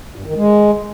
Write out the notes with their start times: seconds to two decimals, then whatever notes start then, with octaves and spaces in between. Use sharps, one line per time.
0.16 G2
0.26 D#3
0.36 G#3